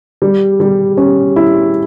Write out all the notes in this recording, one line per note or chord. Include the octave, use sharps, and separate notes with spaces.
G3
G3
C#4
E4